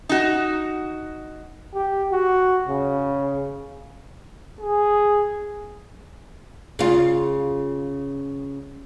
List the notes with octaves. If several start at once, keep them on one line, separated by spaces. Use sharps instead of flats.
D#4 F#4
G4
F#4
C#3
G#4
C#3 F4